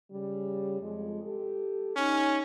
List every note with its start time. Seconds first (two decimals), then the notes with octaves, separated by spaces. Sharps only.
0.11 C#3 G3
0.80 F2 G#3
1.23 G4 A4
1.96 C#4 D#4